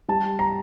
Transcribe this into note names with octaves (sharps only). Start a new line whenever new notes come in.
G3 A5
A#5